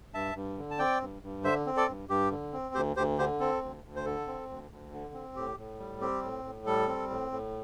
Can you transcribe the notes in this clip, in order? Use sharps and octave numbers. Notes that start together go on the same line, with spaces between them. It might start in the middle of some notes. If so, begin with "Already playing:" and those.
G2 E5 A5
G2
D3
A5
C4 D5 G5
G2
G2
D3 C5 E5
C4
A4 D5
G2
G2 G4
D3
C4
D2 G4 C5
D2 G4 C5
D3 G4 C5
C4 A4
D2
D2
C5
D3 A4
C4
D2
D2
D3
C4
A2 G4
A2
G3
C4 G4
A2
A2
G3 A4
C4
A2
A2